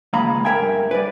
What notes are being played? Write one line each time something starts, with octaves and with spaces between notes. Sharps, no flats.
C#2 G#3 A#3 F5 A#5 B5
G2 A3 A#4 E5 G5 G#5
B4 D5